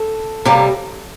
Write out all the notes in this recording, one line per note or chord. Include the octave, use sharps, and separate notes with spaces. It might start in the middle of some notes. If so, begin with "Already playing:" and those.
Already playing: A4
C3 G3 A#3